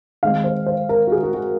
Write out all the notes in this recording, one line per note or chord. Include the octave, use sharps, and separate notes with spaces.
D#3 G#3 C4 F5
C5
C5
A#4
F#4
G#4
F#4
F#4